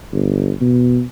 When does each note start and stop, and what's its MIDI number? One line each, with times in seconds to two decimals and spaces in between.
0.12 0.51 31
0.61 1.01 47